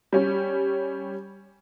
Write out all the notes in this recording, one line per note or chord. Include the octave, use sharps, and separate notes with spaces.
G3 C#4